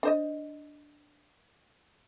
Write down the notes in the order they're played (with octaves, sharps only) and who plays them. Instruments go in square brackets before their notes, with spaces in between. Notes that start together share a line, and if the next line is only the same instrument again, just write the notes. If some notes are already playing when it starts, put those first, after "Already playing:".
[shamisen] D4 C5 D#5